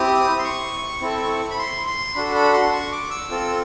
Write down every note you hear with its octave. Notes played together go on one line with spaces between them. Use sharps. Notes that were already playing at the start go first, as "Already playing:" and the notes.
Already playing: C4 E4 G4 D#6
C6
C#6
C4 E4 A4
B5
C6
C6
D4 F#4 A4 B5
B5
C6
C#6
D6
E6
C4 F4 A4